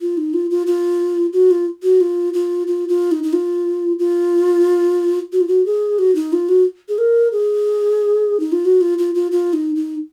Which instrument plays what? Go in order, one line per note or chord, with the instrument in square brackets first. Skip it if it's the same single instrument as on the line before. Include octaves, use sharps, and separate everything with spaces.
[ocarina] F4
D#4
F4
F4
F4
F#4
F4
F#4
F4
F4
F4
F4
D#4
D#4
F4
F4
F#4
F4
F#4
G#4
F#4
D#4
F4
F#4
G#4
A#4
G#4
D#4
F4
F#4
F4
F4
F4
F4
D#4
D#4